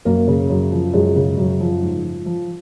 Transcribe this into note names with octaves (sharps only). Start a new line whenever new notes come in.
F#2 A#3 A#4
C#3
F#2
F3
F#2 G#3 G#4
C#3
F#2
F3
G#2
F3
F3